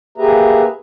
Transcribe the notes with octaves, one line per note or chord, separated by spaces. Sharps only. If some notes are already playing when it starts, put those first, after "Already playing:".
A#3 G4 G#4 B4 E5 A#5